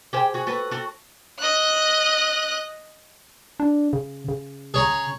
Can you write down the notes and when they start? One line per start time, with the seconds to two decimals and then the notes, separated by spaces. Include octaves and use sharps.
0.13 G4 G#4 C5
0.34 F#4 G#4
0.47 F#4 A4 B4
0.71 F#4 A4
1.40 D#5 F#6
3.60 D4
3.93 C#3
4.28 C#3
4.74 G#4 C#5 A#5